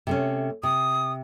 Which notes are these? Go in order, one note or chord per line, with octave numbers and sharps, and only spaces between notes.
C3 A3 C#4
C3 D#6